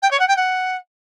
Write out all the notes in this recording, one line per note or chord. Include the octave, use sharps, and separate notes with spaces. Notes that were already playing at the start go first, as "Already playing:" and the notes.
G5
C#5
F#5
G5
F#5